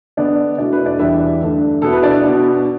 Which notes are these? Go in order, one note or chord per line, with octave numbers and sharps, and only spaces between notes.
D3 B3 D4 D5
B2 A3 D4 E4 D5
B4
D4 D5
E2 E3 G3 D4 E4 E5
G2 D3 A3 D4
B2 B3 E4 A4
B4
D4 D5
B2 B3 D4